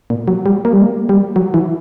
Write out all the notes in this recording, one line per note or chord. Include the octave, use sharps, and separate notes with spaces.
A#2
F#3
G3
A#3
G3
A#3
G3
F#3
E3